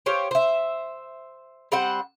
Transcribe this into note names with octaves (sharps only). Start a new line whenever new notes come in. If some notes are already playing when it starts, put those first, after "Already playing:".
G4 C5 C#5 F5
C5 E5
G3 C4 C5 F#5